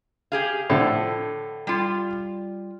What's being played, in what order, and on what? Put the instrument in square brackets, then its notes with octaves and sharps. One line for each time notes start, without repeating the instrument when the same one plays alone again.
[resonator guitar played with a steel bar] G4 G#4 F5
[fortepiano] A2 D3 F3 [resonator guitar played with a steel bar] A4
[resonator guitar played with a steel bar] G3 F4